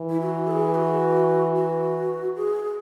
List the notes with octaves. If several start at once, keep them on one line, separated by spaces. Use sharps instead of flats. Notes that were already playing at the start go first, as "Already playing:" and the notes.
Already playing: E3
E4
F#4
A4
G#4
F#4
F#4
G#4
G#4